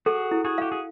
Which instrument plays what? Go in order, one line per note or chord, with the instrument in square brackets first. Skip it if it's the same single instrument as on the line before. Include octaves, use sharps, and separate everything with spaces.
[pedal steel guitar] F#4 G#4 [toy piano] A4
[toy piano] E4
[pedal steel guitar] F#4 G#4
[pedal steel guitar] G4 [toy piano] F5
[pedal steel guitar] G#4